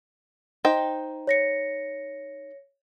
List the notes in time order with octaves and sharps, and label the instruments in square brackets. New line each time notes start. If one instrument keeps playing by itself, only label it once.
[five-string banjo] D#4 C5 G5
[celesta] C#5 A#6 C#7